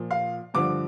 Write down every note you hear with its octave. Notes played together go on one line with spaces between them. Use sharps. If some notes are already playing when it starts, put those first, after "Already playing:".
Already playing: A#2 F3
F5
G2 D3 F3 D6